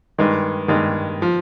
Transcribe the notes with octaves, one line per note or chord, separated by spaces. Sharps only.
G2 D#3 G#3
G2 D#3 G#3
F3